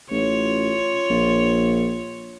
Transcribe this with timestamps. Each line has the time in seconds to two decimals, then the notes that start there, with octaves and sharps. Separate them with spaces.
0.11 A1 F4 C#5
1.10 A#1